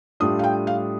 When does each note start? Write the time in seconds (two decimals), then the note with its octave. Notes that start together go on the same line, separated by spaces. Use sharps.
0.20 A2 G3 D4 F4 D#6
0.39 F5
0.44 G5
0.67 F5